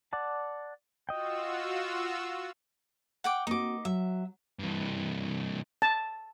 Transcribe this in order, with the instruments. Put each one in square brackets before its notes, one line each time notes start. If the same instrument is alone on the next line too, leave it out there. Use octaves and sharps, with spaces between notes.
[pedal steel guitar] D5 F#5 A5
[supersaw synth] F4 F#4 E6 [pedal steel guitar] D#5 G5
[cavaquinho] F#5 G5 D6
[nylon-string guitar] A#3 C4 F#4 [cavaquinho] D#4 D6
[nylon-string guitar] F#3 [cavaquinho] E5
[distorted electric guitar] G2 E3
[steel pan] A5